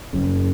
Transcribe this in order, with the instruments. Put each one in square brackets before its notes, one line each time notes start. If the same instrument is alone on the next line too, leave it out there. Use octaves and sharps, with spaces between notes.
[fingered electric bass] F#1 F#2 C#3